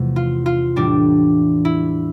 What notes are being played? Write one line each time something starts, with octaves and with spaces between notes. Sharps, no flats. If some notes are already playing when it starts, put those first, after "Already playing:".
Already playing: E2 C3 F3 A3
F4
F4
A2 E3 G3 D4
E4